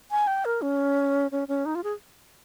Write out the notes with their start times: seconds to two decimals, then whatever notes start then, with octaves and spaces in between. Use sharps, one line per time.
0.11 G#5
0.27 G5
0.45 A#4
0.62 C#4
1.31 C#4
1.48 C#4
1.66 D#4
1.75 F4
1.84 G#4